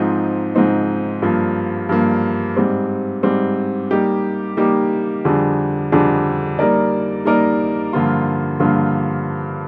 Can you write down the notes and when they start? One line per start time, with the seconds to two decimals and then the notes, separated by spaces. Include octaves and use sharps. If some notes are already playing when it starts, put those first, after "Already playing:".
Already playing: G#2 F3 C4 D#4
0.55 G#2 F3 C4 D#4
1.22 G2 F3 A#3
1.89 G2 F3 A#3
2.57 G#2 G3 C4
3.23 G#2 G3 C4
3.91 G3 A#3 D#4 G4
4.57 G3 A#3 D#4 G4
5.25 F2 D3 G3 D4 G#4
5.92 F2 D3 G3 D4 G#4
6.59 G3 A#3 D#4 A#4 D5
7.25 G3 A#3 D#4 A#4 D5
7.93 G2 D3 F3 A#3 F4
8.60 G2 D3 F3 A#3 F4